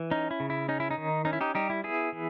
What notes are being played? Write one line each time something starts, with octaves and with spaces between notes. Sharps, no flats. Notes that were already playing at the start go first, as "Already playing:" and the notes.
Already playing: E3
C#4 D#4
E4
C#3
E4
C#4 D#4
E4
D#4
D#3
C#4 D#4
E4
D#4 G4
G3 D#4 G4
E4
B3 E4 G#4
E3